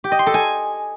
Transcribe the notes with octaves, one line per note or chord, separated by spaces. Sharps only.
G4
D#5
C6
A4
G#5